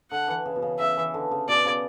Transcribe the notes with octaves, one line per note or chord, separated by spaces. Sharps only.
D3 F#5
E3
C#3
B2
C#3
C#3 E5
E3
D3
C#3
B2 D5
C#3